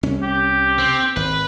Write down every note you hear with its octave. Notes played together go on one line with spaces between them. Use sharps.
C2 C#4
G4
C4
G#1 B4